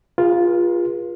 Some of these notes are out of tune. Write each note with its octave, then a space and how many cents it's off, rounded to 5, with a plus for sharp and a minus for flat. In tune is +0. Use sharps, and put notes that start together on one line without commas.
F4 +0 G#4 -30 B4 -45